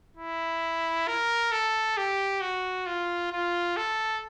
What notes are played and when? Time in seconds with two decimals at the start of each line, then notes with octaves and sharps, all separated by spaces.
0.17 E4
1.08 A#4
1.52 A4
1.97 G4
2.41 F#4
2.86 F4
3.32 F4
3.77 A4